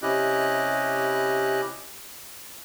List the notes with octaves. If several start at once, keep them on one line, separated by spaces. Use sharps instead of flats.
C3 C#4 E4 G4 D#5 F#6